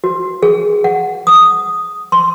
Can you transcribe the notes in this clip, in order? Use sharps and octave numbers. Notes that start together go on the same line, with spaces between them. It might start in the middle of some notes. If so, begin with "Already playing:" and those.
F#4
G#4
F#5
D#6
C6